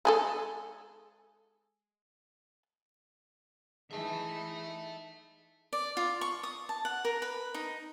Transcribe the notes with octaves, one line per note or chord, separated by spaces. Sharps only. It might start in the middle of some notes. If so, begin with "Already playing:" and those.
G#3 G#4 A4
E3 D#4 G#4 E5 A5
D5
F4
C#6
D#6
A5
F#5
A#4
B4
D#4